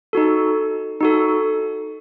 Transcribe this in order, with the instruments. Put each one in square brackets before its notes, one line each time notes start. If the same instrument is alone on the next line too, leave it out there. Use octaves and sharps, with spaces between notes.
[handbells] D#4 F#4 A4
D#4 F#4 A4